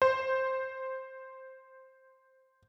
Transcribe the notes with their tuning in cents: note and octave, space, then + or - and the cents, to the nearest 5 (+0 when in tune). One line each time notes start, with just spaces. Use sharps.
C5 +0